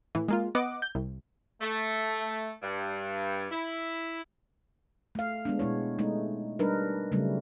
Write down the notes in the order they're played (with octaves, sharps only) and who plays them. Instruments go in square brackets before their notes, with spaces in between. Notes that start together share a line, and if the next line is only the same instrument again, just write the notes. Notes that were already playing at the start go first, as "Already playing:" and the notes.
[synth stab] A2 E3
G#3 A#3 F4
B3 D#5 F#5 D6
G6
C2
[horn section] A3
G2
E4
[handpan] A3 F5
G#3 B3 D4
B2 G#3 E4 C#5
G#3 A3 D#4
G3 D4 D#4 A#4 B4
C#3 F#3 G3 A3